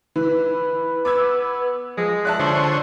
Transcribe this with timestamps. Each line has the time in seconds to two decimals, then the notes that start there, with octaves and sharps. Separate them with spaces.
0.16 E3 B4
1.05 B3 D6 E6 G#6
1.97 F3 G#3
2.25 D5 E5 A5 F#6
2.39 D3 F3 C5 C#5